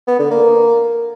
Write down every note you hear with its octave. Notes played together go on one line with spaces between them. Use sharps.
B3
D3
A#3